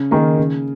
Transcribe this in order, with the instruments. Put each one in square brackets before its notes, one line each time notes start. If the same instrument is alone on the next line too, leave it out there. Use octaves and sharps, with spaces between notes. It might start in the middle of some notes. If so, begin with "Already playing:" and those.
Already playing: [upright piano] C#3
[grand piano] D#3 [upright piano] A#3 D#4 G#4
[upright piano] C#3